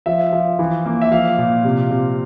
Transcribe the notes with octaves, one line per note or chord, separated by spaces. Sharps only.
F3 E5
F3
E3
A#3
E5
F3 F5
A#2
C3
C3